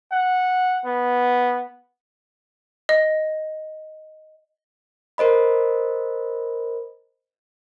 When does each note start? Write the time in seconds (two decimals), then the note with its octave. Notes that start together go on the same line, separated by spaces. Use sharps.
0.11 F#5
0.86 B3
2.89 D#5
5.18 A#4 C5 D#5 B5